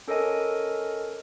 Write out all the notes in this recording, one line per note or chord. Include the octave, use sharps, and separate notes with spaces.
C#4 A4 A#4 C#5 D#5 G#5